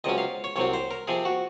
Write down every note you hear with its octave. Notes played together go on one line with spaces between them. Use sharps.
C#2 C3 F#3 C#4 D#5
F5
C#5
C2 C3 F#3 C4 C#5
C5
A#4
C3 F3 C4 G#4
F#4